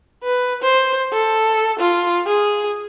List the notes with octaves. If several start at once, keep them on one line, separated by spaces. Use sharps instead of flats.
B4
C5
A4
F4
G#4